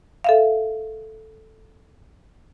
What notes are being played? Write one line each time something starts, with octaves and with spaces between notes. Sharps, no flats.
A4 E5 F5